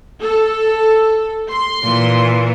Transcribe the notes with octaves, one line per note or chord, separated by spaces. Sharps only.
A4
C6
A#2 E3